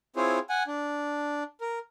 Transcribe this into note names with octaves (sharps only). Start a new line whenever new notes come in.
C4 E4 F4 G#4 C5 C#5
F#5 G#5
D4
A#4